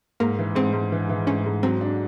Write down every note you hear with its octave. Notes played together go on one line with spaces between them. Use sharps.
G#2 A#3
E3
G#2 C4
G#2
E3
E3
G#2 C#4
G#2
F#3 C4
D4